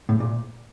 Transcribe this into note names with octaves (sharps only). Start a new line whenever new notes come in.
A2
A#2